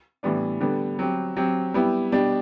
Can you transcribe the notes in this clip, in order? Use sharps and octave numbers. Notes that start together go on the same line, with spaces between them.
A2 E3 G3 B3 D4
D3 G3 B3
F#3 C4 G4
F#3 C4 G4
G3 B3 E4 G4
B2 G3 D4 G4